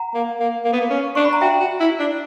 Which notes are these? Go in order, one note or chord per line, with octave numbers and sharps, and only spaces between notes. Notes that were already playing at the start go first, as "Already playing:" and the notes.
Already playing: F#5 A#5
A#3
A#3
A#3
B3
A#3
C#4
D4 C#6
B5
A#5
F#4 E5 G5
F#4
E4
D4